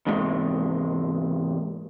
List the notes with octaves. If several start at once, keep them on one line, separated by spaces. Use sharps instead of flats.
E2 G#2 C3 G#3